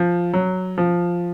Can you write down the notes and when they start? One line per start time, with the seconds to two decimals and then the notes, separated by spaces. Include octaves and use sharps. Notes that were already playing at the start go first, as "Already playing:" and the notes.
Already playing: F3
0.33 F#3
0.78 F3